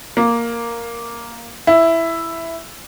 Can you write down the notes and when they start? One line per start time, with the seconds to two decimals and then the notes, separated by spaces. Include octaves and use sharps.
0.17 A#3
1.67 E4